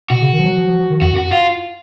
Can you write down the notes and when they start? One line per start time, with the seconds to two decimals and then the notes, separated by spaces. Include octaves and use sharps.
0.10 B2 F#4
0.21 C#3
0.33 D#3
0.39 F3
0.44 F#3
0.56 F3
0.67 F3
0.79 F3
0.90 D#3
1.01 F2 F#4
1.13 F#2
1.16 F#4
1.32 F4